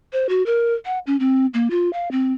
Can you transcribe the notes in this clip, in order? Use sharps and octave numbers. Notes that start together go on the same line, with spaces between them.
C5
F#4
A#4
F#5
C#4
C4
A#3
F4
F5
C4